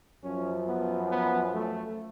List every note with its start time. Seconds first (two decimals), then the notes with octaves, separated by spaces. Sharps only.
0.22 F#2 F3 C#4
0.66 B3
1.09 B3
1.52 A3